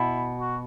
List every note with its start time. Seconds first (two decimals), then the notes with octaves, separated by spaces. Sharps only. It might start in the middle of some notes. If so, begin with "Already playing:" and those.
Already playing: B2 E4
0.40 F#4